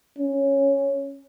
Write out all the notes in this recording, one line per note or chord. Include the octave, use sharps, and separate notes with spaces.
C#4